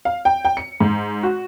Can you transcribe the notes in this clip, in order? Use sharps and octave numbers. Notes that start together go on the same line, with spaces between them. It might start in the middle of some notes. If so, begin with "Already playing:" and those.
F5
G5
G5
C#7
G#2
F#4